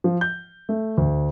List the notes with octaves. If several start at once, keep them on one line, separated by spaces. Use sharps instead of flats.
F3
G6
A3
D2